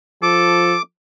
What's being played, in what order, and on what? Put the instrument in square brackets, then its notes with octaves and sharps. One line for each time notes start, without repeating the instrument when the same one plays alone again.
[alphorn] F3 [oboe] A4 [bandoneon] D6